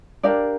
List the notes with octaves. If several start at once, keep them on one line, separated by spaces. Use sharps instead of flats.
D4 G4 A#4 D5 F5